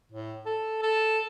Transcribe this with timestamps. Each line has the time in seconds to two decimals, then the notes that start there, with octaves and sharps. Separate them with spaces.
0.12 A2
0.46 A4
0.82 A4